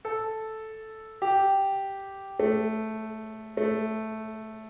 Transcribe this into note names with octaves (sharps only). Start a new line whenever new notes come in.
A4
G4
A3
A3